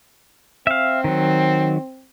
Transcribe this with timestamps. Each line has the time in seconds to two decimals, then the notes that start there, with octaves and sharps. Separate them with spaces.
0.67 C4 E5 F5
1.04 D#3 F#3